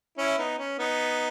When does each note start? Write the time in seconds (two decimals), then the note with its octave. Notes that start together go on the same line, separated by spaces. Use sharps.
0.18 C#4 E4
0.38 B3 D#4
0.58 C#4
0.79 B3 D#4